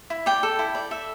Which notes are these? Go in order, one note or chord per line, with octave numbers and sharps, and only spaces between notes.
E4
D5 G5
A4
E4
D5
A4 E5